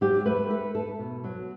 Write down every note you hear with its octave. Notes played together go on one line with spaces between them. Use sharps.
F#3 G4
A3 B4
A3 B4
A3 A4
B2
F#3